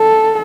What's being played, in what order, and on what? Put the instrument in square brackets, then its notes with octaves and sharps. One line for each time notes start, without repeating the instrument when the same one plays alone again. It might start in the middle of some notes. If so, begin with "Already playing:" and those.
Already playing: [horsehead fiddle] A4